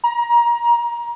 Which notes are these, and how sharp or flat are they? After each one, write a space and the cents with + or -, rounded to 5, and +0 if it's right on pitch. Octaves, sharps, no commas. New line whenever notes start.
A#5 +25